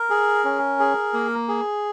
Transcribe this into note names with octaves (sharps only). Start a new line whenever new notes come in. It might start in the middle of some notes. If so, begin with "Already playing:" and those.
Already playing: A#4
G#4
C#4
G#4
A#3
G#4